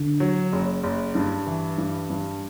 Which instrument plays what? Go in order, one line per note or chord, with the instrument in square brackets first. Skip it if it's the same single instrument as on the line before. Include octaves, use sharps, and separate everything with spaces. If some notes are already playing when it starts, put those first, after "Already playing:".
Already playing: [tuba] D3
[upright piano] F#3
F#1
F#1
G2
E3
G2
G2